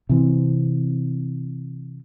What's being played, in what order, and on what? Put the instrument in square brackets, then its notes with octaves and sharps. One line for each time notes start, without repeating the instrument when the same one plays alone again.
[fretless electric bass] C3 E3 C4